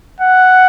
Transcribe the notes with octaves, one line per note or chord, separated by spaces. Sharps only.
F#5